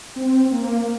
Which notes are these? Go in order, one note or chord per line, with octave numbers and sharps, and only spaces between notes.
C4
C4
A#3